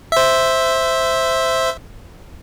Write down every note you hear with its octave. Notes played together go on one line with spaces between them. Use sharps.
C5 E5